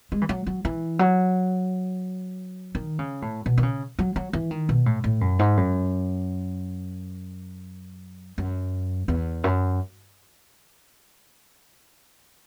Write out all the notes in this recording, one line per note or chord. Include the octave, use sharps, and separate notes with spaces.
G#3
E3
F#3
F#3
E3
F#3
D#3
C#3
A2
B2
D#3
C#3
F#3
F#3
E3
D#3
B2
A2
A2
F#2
G#2
F#2
F#2
E2
F#2